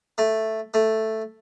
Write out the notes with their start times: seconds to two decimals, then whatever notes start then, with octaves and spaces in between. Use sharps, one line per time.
0.18 A3
0.74 A3